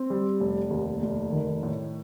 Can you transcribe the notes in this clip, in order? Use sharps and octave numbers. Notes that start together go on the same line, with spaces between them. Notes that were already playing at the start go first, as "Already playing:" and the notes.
Already playing: C4
G3
F1
D#2
F1
D#3
A2